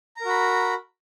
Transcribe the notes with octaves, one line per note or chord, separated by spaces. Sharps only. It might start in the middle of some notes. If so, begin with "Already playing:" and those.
F#4 A#4 A#5 B5